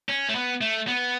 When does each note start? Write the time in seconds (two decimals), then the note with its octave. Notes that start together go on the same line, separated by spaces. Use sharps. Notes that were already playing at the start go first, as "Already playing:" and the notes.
0.09 C#4
0.29 A3
0.35 B3
0.61 A3
0.88 B3